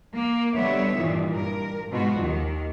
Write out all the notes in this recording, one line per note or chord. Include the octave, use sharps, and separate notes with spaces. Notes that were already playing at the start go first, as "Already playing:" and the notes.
A#3
B2 D3 G3 B3 C#5 E5
G2 A#2 D#3 E3
G2 A#4
G#2 B2 F4 F#4
D#2 D#3